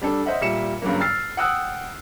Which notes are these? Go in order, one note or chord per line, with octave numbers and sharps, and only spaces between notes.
G3 D4 A4
C5 D#5 E5 F#5
A#2 G3 E5 C#7 E7
G2 C#3 F#3 A#3
E6 F6 A6 C7
F#5 G5 D#6 E6 F#6